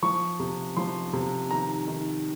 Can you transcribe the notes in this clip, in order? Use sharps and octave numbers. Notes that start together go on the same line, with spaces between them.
F3 C#6
C3
F3 C6
C3
D#3 A#5
D#3